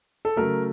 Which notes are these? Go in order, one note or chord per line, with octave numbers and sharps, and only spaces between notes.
A4
C#3 F#3 A3 A#4